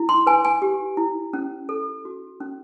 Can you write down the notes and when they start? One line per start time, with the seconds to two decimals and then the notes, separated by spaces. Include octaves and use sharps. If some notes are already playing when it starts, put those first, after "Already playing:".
Already playing: E4
0.09 C6
0.27 B4 G#5
0.45 G#5
0.62 G4
0.97 E4
1.33 C#4
1.69 A4
2.05 F#4
2.40 C#4